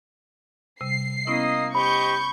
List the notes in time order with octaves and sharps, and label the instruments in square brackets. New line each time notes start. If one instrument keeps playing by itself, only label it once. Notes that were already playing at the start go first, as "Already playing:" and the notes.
[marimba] C3 G3 [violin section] C7
[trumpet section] A#3 D#5 [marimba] B3 C#4 E4
[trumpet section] G4 C5 D#5 [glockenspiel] B5 [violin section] C#6 G6